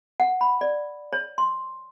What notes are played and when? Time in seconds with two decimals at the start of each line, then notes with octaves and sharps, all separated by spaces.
0.20 F#5
0.41 B5
0.61 D5
1.13 C#5
1.38 C6